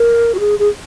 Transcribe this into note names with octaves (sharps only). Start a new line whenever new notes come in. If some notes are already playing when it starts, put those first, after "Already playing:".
Already playing: A#4
F#4
G#4
G#4